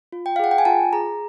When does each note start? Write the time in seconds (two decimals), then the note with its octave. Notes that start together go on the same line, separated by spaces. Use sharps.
0.12 F4
0.26 G5
0.36 F5
0.39 G#4 F#5
0.51 G5
0.58 G#5
0.65 F4 A5
0.93 G#4 A#5